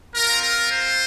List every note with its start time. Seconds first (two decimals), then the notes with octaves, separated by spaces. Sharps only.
0.14 C4 F4 A#4
0.42 A#4
0.71 C5